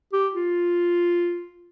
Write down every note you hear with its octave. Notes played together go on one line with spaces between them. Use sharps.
G4
F4